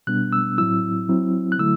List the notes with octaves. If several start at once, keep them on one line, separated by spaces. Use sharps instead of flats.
B2 G3 B3 D4 F#6
E6
A2 F#3 C4 E4 E6
F#3 C4 E4
F#6
D3 F#3 A3 E4 E6